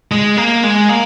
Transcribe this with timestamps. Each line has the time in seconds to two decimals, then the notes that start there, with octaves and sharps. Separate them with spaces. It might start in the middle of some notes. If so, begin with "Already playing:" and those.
0.12 G#3
0.37 A#3
0.63 G#3
0.89 A#3